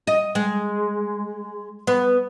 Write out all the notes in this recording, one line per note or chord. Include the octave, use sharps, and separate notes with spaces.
D#5
G#3
B3